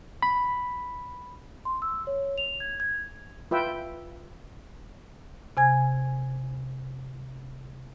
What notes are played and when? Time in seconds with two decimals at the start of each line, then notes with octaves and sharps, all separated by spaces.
0.23 B5
1.65 C6
1.82 E6
2.07 C#5
2.38 F7
2.60 G#6
2.80 G#6
3.51 F4 B4 E5 G5
5.57 C3 G#5 G#6